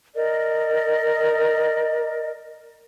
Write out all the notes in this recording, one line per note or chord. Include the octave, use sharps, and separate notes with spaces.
A#4 D5 D#5